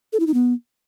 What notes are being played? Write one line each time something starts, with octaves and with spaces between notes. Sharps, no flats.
A4
E4
D#4
B3